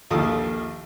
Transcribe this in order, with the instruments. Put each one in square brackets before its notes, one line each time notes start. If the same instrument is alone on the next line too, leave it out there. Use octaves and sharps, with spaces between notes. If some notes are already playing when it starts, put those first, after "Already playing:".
[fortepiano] A#1 D#2 F4 A4 D#6